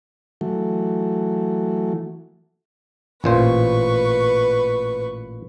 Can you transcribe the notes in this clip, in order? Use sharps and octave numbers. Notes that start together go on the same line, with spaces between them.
E3 F#3 A3
A1 A#2 B4 C5 C#6